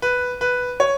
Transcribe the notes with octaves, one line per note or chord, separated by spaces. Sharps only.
B4
B4
C#5